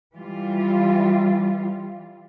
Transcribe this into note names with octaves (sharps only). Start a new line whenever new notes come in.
E3 G3 F4